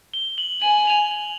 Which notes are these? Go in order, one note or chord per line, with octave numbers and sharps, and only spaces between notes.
G7
F#7
G#5 F#7
F7
F#7